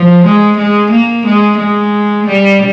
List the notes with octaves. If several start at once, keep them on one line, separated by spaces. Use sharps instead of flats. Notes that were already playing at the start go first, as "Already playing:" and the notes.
Already playing: F3
G#3
G#3
A#3
G#3
G#3
G3